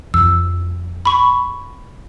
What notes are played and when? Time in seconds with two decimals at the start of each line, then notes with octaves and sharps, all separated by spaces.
0.14 F2 F3 E6
1.05 B5 C#6